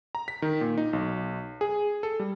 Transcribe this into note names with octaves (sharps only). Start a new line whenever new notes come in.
A#5
B6
D#3
A#2
D#4
B1
G#4
A4
G3